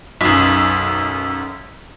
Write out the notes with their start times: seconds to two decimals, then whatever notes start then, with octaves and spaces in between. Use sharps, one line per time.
0.21 B1 F#2